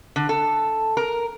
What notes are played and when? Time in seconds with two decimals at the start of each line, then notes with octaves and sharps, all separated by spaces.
0.16 D3
0.29 A4
0.97 A#4